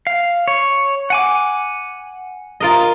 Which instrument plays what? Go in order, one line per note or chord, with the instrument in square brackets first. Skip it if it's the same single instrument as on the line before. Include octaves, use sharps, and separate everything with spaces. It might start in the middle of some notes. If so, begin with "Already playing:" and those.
[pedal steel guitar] F5
C#5
F#5 G#5 D6
[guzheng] F4 A#4 D#5